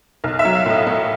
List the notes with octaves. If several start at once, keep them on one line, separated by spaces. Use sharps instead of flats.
B1
E5
F#3
F5
A2 D#5
A3